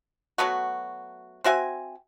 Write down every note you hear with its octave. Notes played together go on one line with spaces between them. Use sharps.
F#3 A3 B3 F#4
C4 F#4 E5 G#5